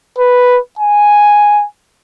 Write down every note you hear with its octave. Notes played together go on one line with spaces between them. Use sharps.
B4
G#5